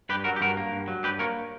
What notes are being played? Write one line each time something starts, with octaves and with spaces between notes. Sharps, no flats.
G2 G4 B4
F#3 F#4 A#4
G4
G2 F#4 A#4
A#3
G2
F#3
G2 G4 B4
A#3 A#4 C#5